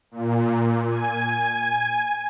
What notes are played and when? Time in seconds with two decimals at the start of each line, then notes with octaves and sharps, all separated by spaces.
0.11 A#2
0.88 G#5